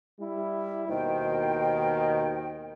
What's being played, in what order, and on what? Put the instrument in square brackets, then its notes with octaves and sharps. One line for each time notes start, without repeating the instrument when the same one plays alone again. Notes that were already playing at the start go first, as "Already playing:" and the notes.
[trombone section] G3 E4
[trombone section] D#2 B2 D#3 [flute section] C5 G5